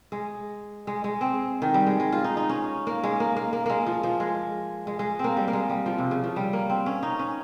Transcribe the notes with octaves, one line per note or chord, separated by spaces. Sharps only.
G#3
G#3
G#3
C4
D#3
G3
G#3
G#3
F4
D#4
D#4
C#4
A#3
G#3
A#3
A#3
A#3
G#3 A#3
F3
F3
G#3
G#3
G#3
A#3 C4
G3
A#3
G#3
G3
F3
C3
C#3
F3
G3
A#3
C4
C#4
D#4
C#4